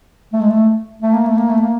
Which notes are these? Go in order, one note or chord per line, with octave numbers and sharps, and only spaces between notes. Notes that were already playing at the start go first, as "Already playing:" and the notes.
A3
G#3
A3
A3
A#3
A3
A#3
A3
A#3